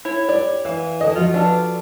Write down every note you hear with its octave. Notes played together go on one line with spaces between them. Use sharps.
E4 C#5
D4 G4 D5
E3 F5
D3 A4 D#5
F3 F4 F#4
D4 A4 B4